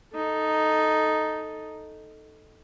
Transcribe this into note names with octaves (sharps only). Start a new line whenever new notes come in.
D#4 A4